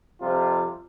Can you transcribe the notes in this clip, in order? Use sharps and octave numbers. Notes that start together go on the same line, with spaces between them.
F2 C3 G3 F4